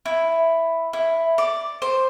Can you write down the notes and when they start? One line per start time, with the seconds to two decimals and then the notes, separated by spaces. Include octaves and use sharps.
0.06 E4
0.93 E4
1.38 D5
1.82 C5